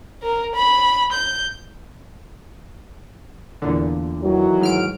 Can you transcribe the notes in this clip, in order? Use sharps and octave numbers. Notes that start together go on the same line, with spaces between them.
A#4
B5
G6
E2 A#2 D3
D#3 E3 F#3
G#2 F6 D7